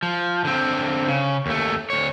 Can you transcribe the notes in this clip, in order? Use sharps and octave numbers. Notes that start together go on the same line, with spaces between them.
F3
D3 C4
C#3
D#2 A3
D2 C#5